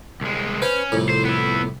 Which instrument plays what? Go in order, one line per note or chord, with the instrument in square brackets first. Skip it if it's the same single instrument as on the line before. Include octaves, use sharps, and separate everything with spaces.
[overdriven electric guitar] C2 G#3
[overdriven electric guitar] C#4 [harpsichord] B4 C5
[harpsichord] C2 F2 A2
[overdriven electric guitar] C5
B3 E4